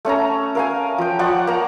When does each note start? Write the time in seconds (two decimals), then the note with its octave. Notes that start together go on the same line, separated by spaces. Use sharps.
0.05 A3 C#4 A5 A#5
0.55 A#4 F5 G#5
0.98 F3 G5
1.19 F3 D5 F#5 C#6
1.47 A#3 A#5